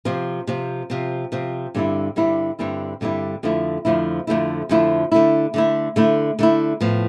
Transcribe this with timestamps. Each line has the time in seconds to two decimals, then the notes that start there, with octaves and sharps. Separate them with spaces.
0.05 C3 F3 C4
0.47 C3 F3 C4
0.90 C3 F3 C4
1.32 C3 F3 C4
1.75 G2 D3 G3 C4 E4
2.16 G2 D3 G3 C4 E4
2.59 G2 D3 G3 C4 E4
3.01 G2 D3 G3 C4 E4
3.43 F2 D3 F3 A3 E4
3.85 F2 D3 F3 A3 E4
4.27 F2 D3 F3 A3 E4
4.69 F2 D3 F3 A3 E4
5.12 D3 A3 E4
5.54 D3 A3 E4
5.96 D3 A3 E4
6.39 D3 A3 E4
6.81 A2 F3 B3